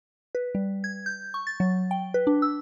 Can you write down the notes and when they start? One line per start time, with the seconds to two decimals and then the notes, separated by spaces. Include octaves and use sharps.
0.35 B4
0.55 G3
0.84 G#6
1.06 G6
1.34 C#6
1.47 A6
1.60 F#3
1.91 G5
2.14 B4
2.27 D4
2.42 E6